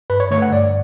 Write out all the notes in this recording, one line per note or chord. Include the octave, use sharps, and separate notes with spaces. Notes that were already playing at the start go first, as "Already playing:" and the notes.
G2 B4
C#5
D3 A3 C#5
F#5
G2 D5